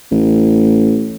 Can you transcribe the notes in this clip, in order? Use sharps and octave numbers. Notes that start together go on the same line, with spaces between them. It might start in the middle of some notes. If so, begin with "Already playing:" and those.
A1